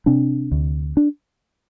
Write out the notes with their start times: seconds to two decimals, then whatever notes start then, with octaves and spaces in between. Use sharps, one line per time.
0.06 C3 C4 D4
0.52 D2
0.97 D4